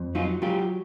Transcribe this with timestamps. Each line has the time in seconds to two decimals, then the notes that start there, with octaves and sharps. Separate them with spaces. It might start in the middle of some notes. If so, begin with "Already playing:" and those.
Already playing: F2
0.15 F#3 D#4 F4
0.42 F#3 F4 G4